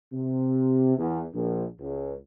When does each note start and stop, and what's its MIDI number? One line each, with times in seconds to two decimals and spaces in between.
0.13 0.97 48
0.98 1.21 40
1.34 1.64 34
1.80 2.14 37